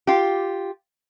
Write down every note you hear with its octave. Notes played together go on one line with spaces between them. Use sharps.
F4 G4